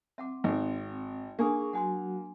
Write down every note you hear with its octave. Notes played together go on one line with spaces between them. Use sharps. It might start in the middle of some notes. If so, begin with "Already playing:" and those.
C4 E5 F#5 D6
G#1 F#5
A#3 D4 G#4 G#5 C#6 D#6
F#3 F#4 F#5 G#5 C6